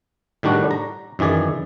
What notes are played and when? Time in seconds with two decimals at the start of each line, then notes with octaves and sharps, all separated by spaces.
0.43 A2 D#3 G3 D4 F#4
0.71 A#5
1.19 F#2 D#3 E3 G#4 D5